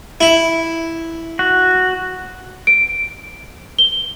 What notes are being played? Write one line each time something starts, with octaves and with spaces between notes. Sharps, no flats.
E4
F#4
D7
G7